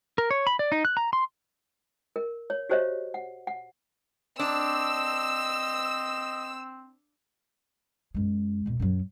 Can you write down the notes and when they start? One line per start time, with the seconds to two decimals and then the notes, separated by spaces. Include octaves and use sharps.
0.18 A#4
0.31 C#5
0.47 B5
0.59 D5
0.72 D#4
0.85 F#6
0.97 A#5
1.13 C6
2.16 A#4
2.50 C#5
2.69 F#4 G4 C5 C#5 D#5 E5
3.14 F#5
3.47 F#5
4.39 C4 D4 D#5 E6
8.14 F#2 G#3
8.66 F2 B2
8.80 F#2 F#3